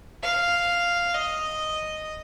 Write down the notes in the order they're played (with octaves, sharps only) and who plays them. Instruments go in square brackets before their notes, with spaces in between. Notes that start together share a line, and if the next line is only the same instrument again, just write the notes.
[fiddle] F5
D#5